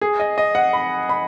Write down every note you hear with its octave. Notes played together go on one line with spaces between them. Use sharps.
G#4
D#5
D#5
F#5
B5
B5